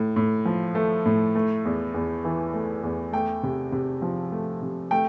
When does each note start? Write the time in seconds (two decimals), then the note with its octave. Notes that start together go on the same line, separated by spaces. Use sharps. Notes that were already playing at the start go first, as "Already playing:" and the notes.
Already playing: A2
0.16 A2
0.45 F3
0.75 A3
1.06 A2
1.35 A3
1.65 E2
1.94 E2
2.25 E3
2.54 A3
2.83 E2
3.13 A3 G5
3.43 C3
3.72 C3
4.02 F3
4.32 A3
4.62 C3
4.91 A3 G5